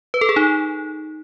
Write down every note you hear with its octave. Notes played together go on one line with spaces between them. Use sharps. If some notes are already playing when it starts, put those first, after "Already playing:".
B4
A4
G#4
D#4